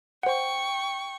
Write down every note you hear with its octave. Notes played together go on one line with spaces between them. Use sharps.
C5 F#5 G5 C#6